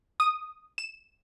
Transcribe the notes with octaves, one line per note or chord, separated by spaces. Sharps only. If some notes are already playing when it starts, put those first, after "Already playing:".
D#6
E7